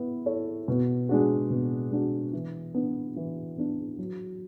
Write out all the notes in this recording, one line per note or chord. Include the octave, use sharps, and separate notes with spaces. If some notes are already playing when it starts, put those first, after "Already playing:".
Already playing: B3 E4
E4 A4 C#5
B2
G#3 D4 F#4
B2
G#3 D4 F#4
E3
B3 D4
E3
B3 D4
F#3